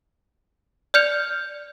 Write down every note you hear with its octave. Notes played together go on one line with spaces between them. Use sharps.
D5 F6 G6 C#7 F7